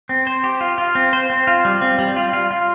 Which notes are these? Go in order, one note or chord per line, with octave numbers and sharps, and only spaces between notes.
C4
C5
G4
F4
F4
C4
C5
C4
F4
G3
C4
G3
F4
F4
F4